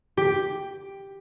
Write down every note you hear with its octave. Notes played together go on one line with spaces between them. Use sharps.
G4